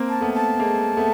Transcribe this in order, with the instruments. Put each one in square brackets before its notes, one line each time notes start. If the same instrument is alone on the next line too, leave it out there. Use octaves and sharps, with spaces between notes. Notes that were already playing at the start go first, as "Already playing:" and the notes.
Already playing: [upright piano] A#3 C4
[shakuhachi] A5
[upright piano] A3 B3
[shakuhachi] A5
[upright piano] G#3 A#3
A3 B3